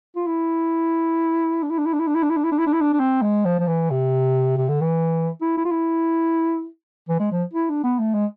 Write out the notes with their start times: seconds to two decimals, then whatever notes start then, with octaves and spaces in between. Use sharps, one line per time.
0.16 F4
0.27 E4
1.63 D4
1.70 E4
1.78 D4
1.86 E4
1.93 D4
2.00 E4
2.07 D4
2.15 E4
2.23 D4
2.30 E4
2.37 D4
2.44 E4
2.52 D4
2.58 E4
2.67 D4
2.73 E4
2.81 D4
2.93 D4
3.00 C4
3.22 G#3
3.45 F3
3.59 F3
3.67 E3
3.91 C3
4.57 C3
4.69 D3
4.81 E3
5.41 E4
5.57 E4
5.65 F4
5.71 E4
7.09 E3
7.19 G#3
7.32 F3
7.53 E4
7.69 D4
7.83 B3
7.99 A3
8.14 G#3